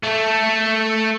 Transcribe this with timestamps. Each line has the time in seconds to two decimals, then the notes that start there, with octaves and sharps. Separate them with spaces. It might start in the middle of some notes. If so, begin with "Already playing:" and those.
0.03 A3 A4